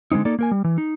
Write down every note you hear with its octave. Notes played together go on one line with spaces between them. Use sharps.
D3 G#3 A#3 C4 D#4
A#3 D#4 A4 D5
A#3 A#4 G#5
G3
E3
D#4